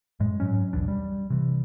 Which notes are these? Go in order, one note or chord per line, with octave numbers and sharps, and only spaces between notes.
F#2 A2 G#3
G#2 F#3 C#4
B1 E2 D4
G3
C3 E3